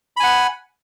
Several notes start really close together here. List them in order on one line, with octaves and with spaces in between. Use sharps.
B5 G#5 F#5